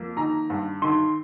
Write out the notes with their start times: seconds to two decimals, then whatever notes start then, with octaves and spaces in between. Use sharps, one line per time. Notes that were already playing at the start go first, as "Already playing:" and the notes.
Already playing: F2 A#3
0.17 D#3 A#5
0.50 G2
0.82 D#3 C6